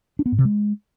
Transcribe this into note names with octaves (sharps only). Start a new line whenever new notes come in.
D4
B3
G#2
C3
G#3